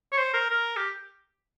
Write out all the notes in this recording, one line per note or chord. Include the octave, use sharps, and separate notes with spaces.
C#5
C5
A#4
A#4
G4